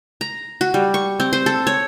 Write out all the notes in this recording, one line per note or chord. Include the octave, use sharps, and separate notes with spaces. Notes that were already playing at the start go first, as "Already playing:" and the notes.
A#5
F#4
G3
C#6
C4
C5
A4
C#5